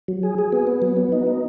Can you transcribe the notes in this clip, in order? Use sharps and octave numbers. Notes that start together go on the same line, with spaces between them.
F#3
G#4
G#4
B3
B3
F#3
B3
D#4
D#4